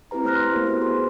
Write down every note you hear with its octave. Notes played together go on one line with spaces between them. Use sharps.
C4 E4 G4 B4 A#5
A3 C5 F6 F#6 A#6
C6
A#3 B3 E4 G4 A#4 C5
F#4 B4 C5
G#4 B4 C6